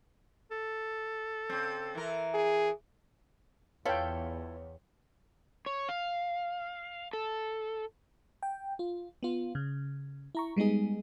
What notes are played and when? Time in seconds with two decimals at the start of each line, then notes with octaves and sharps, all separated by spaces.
0.51 A4
1.50 C#3 C4
1.95 E3 A#4
2.34 G#4
3.85 E2 E4 F4 A4 B4 C#5 F5 G5
5.66 C#5
5.89 F5
7.13 A4
8.43 G5
8.79 F4
9.23 B3 F4
9.55 C#3
10.35 E4 A#5 C#6
10.56 G3 G#3 B3 D#4 G#4